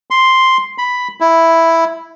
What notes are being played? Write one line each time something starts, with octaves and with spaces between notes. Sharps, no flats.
C6
B5
E4